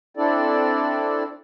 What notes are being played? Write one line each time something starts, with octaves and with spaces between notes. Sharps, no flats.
C4 D4 E4 A4 D5